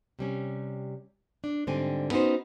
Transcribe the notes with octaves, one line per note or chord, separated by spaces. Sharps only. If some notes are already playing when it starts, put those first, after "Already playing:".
C3 G3 C#4
D4
G#2 D3 G3 C4 G#5
B3 C#4 D#4 F#4 C5